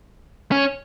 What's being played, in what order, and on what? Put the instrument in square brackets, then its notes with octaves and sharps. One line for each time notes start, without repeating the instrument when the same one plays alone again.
[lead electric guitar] C#4